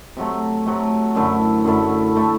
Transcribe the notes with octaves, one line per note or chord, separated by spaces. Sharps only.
C3 F#3 A3
C3 F#3 A3
F#2 D3 A3 E4
F#2 D3 A3 E4
D3 A3 E4